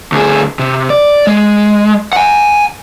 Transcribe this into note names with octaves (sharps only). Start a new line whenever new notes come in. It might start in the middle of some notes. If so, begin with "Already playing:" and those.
D2 G#4
C3
D5
G#3
F#5 G#5